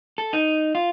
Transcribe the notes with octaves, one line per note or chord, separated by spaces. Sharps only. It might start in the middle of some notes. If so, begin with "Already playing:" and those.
A4
D#4
F4